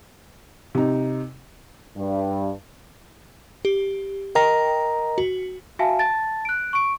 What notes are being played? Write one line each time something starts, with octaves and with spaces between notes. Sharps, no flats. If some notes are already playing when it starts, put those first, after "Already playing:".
C3 D#4
G2
G4
A#4 D#5 G5 A#5
F#4
F#4 E5 F5 G#5 A5
A5 A6
F#6 D7
C#6 D7